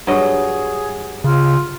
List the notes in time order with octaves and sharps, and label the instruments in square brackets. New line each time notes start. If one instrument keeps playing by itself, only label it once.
[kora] G2 F#3 D#5 [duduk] G#4
[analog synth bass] C#3 [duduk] F4